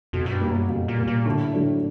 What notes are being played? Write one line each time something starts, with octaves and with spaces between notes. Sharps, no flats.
F2 B2
F#2
G2
G3 A#3
F#2
F2 B2
A#2
G3 A#3
A#2
A2 D3
F#3 A3 D4